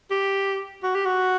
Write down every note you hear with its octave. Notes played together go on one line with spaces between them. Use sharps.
G4
F#4
G4
F#4